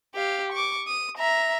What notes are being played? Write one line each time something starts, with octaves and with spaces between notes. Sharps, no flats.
G4 F5
C#6 D6
D#6
E5 A#5